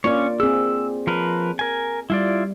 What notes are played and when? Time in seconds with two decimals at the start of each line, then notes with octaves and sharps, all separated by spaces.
0.04 A#3 C#4 F4 C#5 D5
0.40 C4 G#4 E6
1.07 F3 A#4 B4
1.59 A#4 G#5
2.10 G3 E4 F4 D5